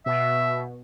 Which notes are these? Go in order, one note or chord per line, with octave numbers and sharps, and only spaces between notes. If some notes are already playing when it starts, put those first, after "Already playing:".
B2 E5